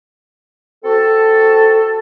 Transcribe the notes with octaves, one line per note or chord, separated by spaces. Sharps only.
C4 F#4 A4